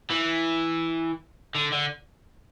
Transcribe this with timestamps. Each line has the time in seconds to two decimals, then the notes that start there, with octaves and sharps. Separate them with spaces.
0.10 E3
1.55 D3
1.72 D3